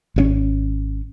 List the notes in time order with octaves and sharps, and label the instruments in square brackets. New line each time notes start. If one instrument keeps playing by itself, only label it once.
[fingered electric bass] G#1 B2 C#4